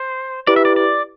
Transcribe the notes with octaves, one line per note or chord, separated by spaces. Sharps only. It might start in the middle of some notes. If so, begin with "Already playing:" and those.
Already playing: C5
E4 G4 B4 D5
E5
D5
D5